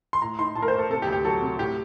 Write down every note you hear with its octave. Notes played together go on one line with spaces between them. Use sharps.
C6
A2 A#5
D#4 C6
A2 A5
A#4
A3 C5
A4
C3 A4
G4
D2
G4
F#3 A4
C3
A2 G4